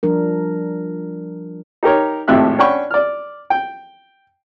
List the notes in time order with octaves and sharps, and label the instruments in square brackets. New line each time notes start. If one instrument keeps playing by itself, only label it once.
[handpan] F3 G3 D4 A#4
[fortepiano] D#4 G4 A#4 C#5
G#1 F2 A2 G4 E5 F#6
C#4 D4 F#5 G5 B5 C#6
D5 F6
G5